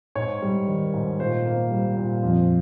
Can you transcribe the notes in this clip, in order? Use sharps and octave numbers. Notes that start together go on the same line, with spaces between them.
G#2 C#5
G3
D#3
G#2
A#2 C5
A#3
G3
A#2
F2